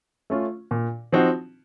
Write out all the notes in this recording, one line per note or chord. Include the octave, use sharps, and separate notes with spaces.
A3 C#4 F4
A#2
F3 C4 D#4 F#4